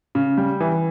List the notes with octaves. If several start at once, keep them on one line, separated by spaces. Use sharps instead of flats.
C#3
G3
E3